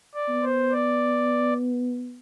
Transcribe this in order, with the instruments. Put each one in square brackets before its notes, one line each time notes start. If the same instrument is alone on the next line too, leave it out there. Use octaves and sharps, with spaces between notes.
[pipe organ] D5
[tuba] B3
[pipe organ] C5
D5